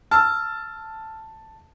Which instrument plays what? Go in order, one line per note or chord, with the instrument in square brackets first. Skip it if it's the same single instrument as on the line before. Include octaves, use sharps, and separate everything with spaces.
[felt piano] A5 [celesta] E6 F6